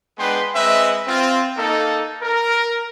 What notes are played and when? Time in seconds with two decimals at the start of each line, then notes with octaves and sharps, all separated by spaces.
0.18 G#3 B3 D4 B4 G5 C6
0.55 G#3 C4 B4 D#5 E5
1.07 C4 F4
1.57 A#3 D#4 A4
2.22 A#4